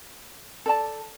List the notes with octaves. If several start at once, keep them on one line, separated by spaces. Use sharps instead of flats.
A4 D5 A5